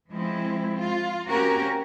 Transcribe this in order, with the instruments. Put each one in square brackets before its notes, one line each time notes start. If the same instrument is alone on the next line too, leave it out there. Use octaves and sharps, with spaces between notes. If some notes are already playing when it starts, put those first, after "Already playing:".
[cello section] F3 G#3 C4 E4
F4
A#3 C4 C#4 F#4 G4 A#4